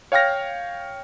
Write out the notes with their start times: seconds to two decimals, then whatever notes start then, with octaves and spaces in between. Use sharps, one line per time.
0.12 C#5 F5 G5 F6 A#6